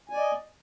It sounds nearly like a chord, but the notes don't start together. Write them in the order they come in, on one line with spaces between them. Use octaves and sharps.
G#5 D5 D#5